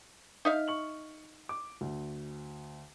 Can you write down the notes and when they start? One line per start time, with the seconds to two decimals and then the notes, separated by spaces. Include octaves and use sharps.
0.45 D#4 E5 F5
0.68 C#6 F#7
1.49 D6
1.81 D2